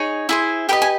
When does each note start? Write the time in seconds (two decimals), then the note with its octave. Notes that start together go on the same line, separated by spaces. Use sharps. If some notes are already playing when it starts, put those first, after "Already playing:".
Already playing: D#4 G#4 C#5
0.29 E4 G#4 C5
0.69 G4 B4 D#5 G5
0.82 G#5